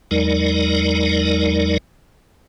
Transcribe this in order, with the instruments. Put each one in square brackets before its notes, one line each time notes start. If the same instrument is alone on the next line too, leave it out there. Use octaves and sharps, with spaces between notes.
[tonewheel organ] E2 F#3 G#3 D#4 A#4 D5